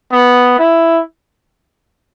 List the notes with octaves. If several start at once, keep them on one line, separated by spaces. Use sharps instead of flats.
B3
E4